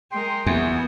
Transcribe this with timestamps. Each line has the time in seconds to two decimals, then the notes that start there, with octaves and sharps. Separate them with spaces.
0.12 G#3 A#4 G5 C6
0.46 E2 A#3 B3 F#4 E5 G#5